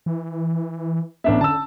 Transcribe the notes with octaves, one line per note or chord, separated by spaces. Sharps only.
E3
A1 B3 D4 E5
D3 A5 E6